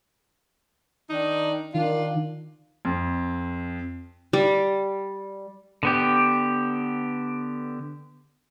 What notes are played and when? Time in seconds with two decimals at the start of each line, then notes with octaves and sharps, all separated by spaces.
1.10 D#3 D4 D#4
1.74 D#3 D4 F4
2.85 F2
4.33 G3
5.83 D3 B3 G4